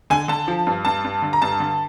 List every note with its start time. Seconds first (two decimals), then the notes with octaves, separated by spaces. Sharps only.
0.10 D3 G#5
0.28 D3 A5
0.48 F3
0.67 G2
0.85 G2 A5
1.04 G2
1.22 D3
1.33 A#5
1.42 G2 A5
1.60 D3